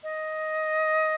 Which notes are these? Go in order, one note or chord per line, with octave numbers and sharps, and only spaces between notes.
D#5